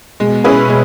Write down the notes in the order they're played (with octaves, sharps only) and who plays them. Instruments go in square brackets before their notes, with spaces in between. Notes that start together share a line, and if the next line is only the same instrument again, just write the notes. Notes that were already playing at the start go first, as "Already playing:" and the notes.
[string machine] B2 [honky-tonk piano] G#3
[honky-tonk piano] C#4 E4 G#4 B4
G#3